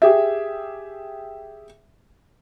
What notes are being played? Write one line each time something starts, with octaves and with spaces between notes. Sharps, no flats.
G4 G#4 E5